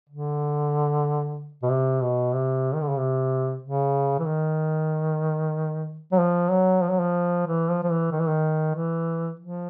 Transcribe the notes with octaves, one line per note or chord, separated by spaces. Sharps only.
D3
B2
C3
B2
C3
D#3
D3
C#3
C3
C#3
E3
D#3
F#3
F3
F#3
F3
F#3
F3
E3
F3
F3
E3
D#3
E3
D#3
E3
F3